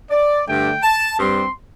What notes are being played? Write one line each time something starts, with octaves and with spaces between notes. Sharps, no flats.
D5
G2 D3 A3 D4 G5
A5
G2 G3 C4 C6